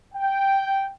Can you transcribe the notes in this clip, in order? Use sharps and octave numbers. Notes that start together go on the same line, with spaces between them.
G5